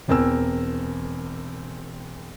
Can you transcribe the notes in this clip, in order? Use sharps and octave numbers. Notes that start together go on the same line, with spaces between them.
E1 E2 C4 A#4 G#5 E6